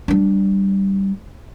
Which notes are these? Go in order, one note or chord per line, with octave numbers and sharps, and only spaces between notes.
G3 D4